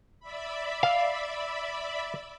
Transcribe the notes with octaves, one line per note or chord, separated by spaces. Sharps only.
D5 E5 B5
F5